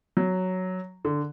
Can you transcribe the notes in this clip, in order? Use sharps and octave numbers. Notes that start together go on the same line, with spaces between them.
F#3
D3